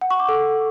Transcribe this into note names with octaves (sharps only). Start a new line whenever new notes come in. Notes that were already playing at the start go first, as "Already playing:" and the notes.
F#5
C#6
D6
A4